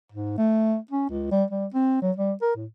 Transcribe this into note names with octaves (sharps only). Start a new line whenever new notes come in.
G#2
A3
C#4
C#2
G3
G3
C4
F#3
G3
A#4
A2